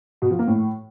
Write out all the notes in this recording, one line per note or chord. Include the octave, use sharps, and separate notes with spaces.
B2
F3
A#3
A2